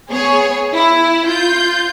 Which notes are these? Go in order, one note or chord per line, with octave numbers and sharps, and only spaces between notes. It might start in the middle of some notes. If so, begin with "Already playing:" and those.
B3 G#4 C#5
E4
F4 G6